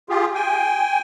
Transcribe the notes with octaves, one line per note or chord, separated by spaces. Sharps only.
F4 G4 G#4
G5 G#5